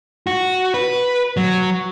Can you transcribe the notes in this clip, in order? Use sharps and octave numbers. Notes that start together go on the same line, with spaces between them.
F#4
B4
F#3